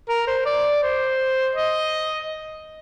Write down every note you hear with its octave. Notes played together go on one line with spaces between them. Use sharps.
A#4
C5
D5
C5
D#5